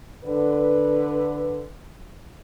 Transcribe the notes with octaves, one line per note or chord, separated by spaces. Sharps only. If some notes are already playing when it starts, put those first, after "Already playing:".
D3 B4